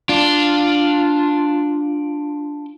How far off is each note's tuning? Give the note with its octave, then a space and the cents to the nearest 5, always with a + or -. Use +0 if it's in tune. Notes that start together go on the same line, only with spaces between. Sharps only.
D4 +0 F4 +5